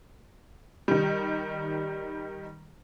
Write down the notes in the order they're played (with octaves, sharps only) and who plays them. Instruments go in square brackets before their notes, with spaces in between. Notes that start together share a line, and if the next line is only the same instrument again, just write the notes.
[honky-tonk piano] D#3 G3